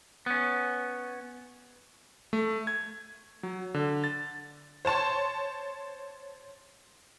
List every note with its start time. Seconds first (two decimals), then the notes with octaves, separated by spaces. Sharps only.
0.26 B3 C#4
2.33 A3
2.67 G#6
3.43 F#3
3.74 D3
4.04 A6
4.85 C5 C#5 A5 C6